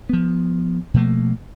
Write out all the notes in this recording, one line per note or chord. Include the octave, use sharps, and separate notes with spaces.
F3 B3
B2 F3 A3 A#3